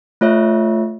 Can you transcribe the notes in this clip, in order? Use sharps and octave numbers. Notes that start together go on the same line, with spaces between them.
A3 F4 C#5 E5